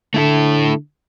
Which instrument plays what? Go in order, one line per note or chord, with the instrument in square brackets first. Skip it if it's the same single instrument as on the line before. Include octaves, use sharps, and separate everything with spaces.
[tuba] D3 [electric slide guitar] A3 E4 A4